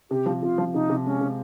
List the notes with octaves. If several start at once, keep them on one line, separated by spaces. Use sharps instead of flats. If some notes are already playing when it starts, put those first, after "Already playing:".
C3 G4
F3
C3 F4
F3
C3 D#4
C3
G#3 C#4
C3